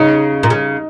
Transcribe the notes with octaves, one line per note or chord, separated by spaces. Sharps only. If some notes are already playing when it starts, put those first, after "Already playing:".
Already playing: C#3 D#4
A#2
C#3